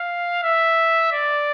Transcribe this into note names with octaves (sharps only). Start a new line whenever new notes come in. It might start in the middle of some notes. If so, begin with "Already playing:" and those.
Already playing: F5
E5
D5